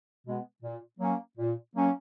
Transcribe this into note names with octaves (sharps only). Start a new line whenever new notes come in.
B2 G#3 B3
A#2
F#3 A#3 C#4
A#2
F#3 A#3 C#4